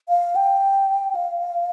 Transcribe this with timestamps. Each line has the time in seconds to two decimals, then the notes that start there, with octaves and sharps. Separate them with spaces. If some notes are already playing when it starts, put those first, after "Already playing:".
0.09 F5
0.36 G5
1.15 F5